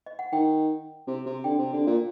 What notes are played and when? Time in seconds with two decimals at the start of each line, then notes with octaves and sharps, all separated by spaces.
0.06 D#5
0.19 F#5
0.32 D#3 G5
1.07 C3
1.26 C3
1.44 D3 G5
1.59 C3
1.73 D3
1.87 A#2